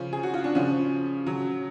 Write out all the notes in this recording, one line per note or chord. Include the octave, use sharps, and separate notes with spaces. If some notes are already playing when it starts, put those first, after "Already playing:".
Already playing: C#3 F3 C#4
G#4
F#4
F4
D4
C#3 F3 C#4
C#3 F#3